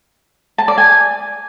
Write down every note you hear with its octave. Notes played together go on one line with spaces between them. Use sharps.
A5
D5
G#5